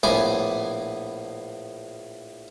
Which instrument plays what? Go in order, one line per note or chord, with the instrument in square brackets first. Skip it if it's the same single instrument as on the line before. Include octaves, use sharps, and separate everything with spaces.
[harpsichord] A#1 A2 B3 G#5 D6